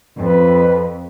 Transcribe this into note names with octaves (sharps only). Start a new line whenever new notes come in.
F2 B4